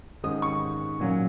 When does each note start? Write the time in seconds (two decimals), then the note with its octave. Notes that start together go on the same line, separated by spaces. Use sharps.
0.23 G#2 D#3 G#3 C#4 D#6
0.42 C#6
1.00 A#2 F#3 C#4